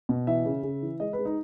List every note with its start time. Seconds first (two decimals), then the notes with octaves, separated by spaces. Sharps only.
0.09 B2
0.27 E3 E5
0.45 C#3
0.63 C#3
0.82 E3
1.00 G#3 D#5
1.13 B4
1.19 G#3
1.25 D#4